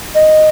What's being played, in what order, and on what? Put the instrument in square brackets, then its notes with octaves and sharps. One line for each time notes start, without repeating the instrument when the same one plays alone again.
[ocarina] D#5